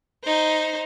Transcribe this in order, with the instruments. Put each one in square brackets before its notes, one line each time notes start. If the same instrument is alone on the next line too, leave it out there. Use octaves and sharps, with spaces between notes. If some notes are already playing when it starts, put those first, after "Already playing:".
[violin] D#4 C5